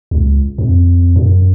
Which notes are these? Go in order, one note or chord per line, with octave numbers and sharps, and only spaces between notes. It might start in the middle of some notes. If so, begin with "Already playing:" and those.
C#2
F2
F#2